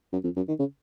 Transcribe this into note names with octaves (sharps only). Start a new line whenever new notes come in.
F#2
F2
F#2
D#3
C#3